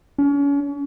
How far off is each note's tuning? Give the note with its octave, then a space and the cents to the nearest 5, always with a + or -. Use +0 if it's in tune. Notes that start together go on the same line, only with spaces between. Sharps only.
C#4 +35